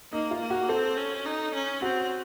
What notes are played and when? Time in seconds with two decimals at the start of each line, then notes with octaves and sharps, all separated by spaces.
0.12 A#3 D#4
0.31 F4
0.41 A#3
0.50 F#4
0.69 C4 A4
0.97 C#4
1.26 D#4
1.55 C#4
1.82 C4 F#4